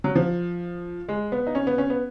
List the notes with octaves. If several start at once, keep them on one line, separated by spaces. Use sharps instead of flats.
F#3
F3
G#3
B3
D#4
C#4
B3
C#4
B3